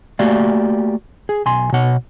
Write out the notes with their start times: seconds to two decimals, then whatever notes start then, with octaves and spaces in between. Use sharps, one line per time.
0.19 A3 A#3 F#4 G4 D5 F5
1.29 G#4
1.45 B1 G#5 C6
1.72 B2 C#5 F#5